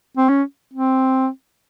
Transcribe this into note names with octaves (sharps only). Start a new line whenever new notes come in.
C4
C#4
C4